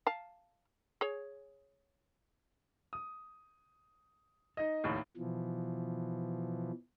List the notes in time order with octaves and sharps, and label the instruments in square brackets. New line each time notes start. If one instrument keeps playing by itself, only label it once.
[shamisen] F5 A5
G#4 C#5
[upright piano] D#6
D#4 D#5
F1 D#2 A2
[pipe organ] B2 E3 F3